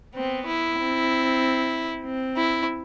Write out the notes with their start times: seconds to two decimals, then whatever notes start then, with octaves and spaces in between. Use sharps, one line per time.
0.15 B3 C4
0.47 E4
0.79 C4
2.05 C4
2.37 E4